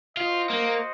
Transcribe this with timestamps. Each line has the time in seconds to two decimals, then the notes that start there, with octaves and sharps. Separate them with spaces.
0.17 F4 F#4 C5 D#5
0.50 A#3